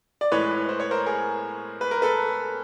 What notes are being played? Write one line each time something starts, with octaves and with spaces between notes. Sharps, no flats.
D5
A2 E3 G#3 B4 C#5
C5
C#5
A#4 C5
G#4 A#4
B4
A#4
A4 B4